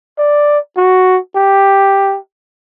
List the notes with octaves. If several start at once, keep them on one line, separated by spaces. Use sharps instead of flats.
D5
F#4
G4